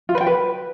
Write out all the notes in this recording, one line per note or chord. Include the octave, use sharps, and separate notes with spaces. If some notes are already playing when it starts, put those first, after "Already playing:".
F4
B4
G5
B4